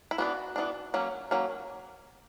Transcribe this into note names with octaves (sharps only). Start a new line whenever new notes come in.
E4
E3 B3 D4 F#4
E3 B3 D4
F#3 A#3 C#4
F#3 A#3 C#4